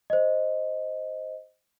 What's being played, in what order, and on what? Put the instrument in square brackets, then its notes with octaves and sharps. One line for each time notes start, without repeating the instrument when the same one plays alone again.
[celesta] C5 D#5